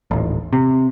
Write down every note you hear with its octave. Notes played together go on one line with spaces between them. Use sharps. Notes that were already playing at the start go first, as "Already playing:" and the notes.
D#1 A1
C3